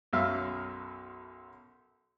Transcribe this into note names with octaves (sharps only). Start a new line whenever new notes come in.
B1 F#2 F#3 E5 F5 F6